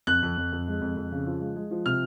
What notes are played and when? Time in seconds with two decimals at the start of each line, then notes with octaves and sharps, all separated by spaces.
0.07 F2 F#6
0.22 F2
0.37 F2
0.52 F2
0.68 G#3
0.81 F2
0.97 F2
1.12 C#3
1.26 F3
1.41 G#3
1.56 G#3
1.71 F3
1.86 C3 F6